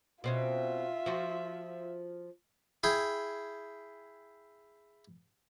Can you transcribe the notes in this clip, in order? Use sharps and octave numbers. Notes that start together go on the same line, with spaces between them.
B2 C4 C#4 F4 E5
F3 F#4
E4 G#4 G5